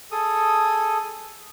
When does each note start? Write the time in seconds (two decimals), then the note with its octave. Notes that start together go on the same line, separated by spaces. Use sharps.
0.11 G#4 A4 D#6